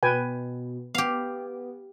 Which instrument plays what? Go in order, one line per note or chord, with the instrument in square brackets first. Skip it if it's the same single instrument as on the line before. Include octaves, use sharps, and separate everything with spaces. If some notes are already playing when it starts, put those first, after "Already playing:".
[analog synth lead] B2 [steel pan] B4 G5 G#5
[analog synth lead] B3 [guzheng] G4 F5